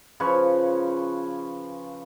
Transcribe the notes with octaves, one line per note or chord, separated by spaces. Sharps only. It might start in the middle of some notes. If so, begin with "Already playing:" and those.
C#3 F3 B4 C#5